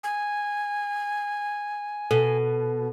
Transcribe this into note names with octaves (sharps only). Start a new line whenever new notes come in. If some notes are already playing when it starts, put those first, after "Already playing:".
G#5
B2 A4